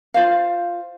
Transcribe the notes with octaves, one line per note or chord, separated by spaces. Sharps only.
F4 C5 F5